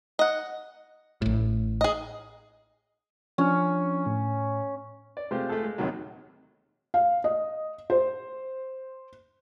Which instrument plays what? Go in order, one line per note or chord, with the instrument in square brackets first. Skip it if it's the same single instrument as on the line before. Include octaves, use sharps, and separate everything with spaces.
[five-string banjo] D#5 F#5
[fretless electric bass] A1 A2
[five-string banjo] G#4 D#5
[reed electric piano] F3 D4 F6 [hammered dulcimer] C#4
[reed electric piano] A2
[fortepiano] D5
C3 G#3 A3 F4 G4 C5
A3 F4 G#4 A4
G#3
A#1 D#2 C3 D#3 F#3
[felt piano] F5
D#5
C5